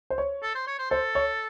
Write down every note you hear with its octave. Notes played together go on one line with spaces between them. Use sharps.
C5
C#5
A4
C5
C#5
C5
A4 C5
C#5